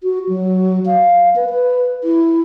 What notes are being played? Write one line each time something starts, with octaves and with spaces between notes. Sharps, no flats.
F#4
F#3
F5
B4
B4
E4